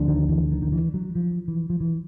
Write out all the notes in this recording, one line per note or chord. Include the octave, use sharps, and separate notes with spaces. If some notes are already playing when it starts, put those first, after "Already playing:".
Already playing: D2 D3 F3 A3 D4
D#3
E3
D#3
D#3
E3
F#3
F3
E3
F3
E3